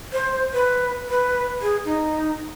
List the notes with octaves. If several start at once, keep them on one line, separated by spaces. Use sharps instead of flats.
C5
B4
B4
G#4
D#4